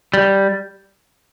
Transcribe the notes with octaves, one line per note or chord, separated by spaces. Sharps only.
G3